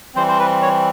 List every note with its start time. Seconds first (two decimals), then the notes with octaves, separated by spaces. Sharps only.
0.15 E3 G3 C4 C5
0.29 C5
0.39 B4
0.62 C#5